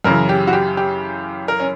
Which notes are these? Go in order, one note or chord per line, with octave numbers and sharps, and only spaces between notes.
F#2 C#3 E3 A#4
G4
F#4
G4
G4
A#4
C#4